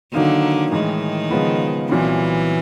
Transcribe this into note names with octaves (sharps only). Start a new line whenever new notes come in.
D3 D#3 F#3 A#3 D#4
A2 D#3 E3 G#3
C#3 F3 G#3 B3
C2 A#2 E3 F#3 B3